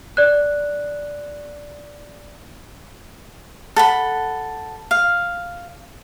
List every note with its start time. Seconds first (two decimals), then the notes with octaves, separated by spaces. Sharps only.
0.17 D5 F#6
3.76 A4 F#5 B5
4.91 F5